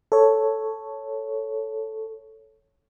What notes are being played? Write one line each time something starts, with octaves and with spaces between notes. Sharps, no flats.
A4 C#5